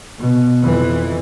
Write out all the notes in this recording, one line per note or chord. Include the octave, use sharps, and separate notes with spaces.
B2
F2 E3